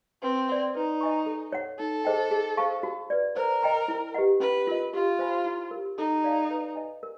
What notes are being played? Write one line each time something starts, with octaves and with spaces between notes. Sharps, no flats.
C4 B4
D5 F#5
D#4 B4
D#5 G#5 C#6
A4
C#5 F#5
D#4 A4
G#4 C5 D#5 G5
G#4
C5 F5 A5 C#6
F#4
B4 D5
A#4 C5
D#5 G5 A#5
E4
G4 B4 D#5 F#5
C#4 B4
F4 A#4 D#5
F4 G4
C5 F5 G#5 B5
E4
G4 A#4
D#4 A4
D5 F5 A5
B4
D#5 G#5
A#4